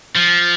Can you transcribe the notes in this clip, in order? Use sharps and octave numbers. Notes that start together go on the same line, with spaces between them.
F3